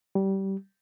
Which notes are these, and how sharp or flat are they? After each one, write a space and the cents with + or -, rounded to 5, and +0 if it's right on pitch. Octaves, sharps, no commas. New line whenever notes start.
G3 -20